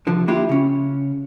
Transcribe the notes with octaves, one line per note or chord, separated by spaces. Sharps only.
C2 D3 F3
A#3 D4 E4 F4 G4
C#3 C#4